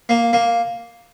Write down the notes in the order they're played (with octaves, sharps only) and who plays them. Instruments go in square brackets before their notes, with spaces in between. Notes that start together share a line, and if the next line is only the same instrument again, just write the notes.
[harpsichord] A#3
A#3